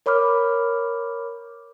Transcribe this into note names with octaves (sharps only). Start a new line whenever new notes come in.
A#4 C#5 B5 D6 F6